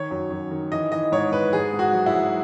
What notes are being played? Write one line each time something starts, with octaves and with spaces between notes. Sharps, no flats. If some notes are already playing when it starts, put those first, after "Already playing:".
Already playing: D#3 C#5
F#2
F#2
D#3
E3 D#5
E3 D#5
G#2 C#5
G#2 B4
G#2 G#4
G#2
F#4
F#3
E4
F#3